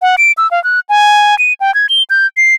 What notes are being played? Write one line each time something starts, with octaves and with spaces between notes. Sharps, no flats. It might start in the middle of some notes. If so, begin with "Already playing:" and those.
F#5
D7
E6
F5
F#6
G#5
D#7
G5
G#6
G7
G6
C7